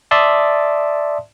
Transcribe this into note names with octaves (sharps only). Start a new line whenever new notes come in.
D5 E5 A5 C6 D#6